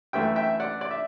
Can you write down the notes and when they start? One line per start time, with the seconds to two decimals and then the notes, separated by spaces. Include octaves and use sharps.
0.13 F#2 E3 A3 E5 G5
0.36 E5 G5
0.60 D5 F#5
0.81 D5
0.91 E5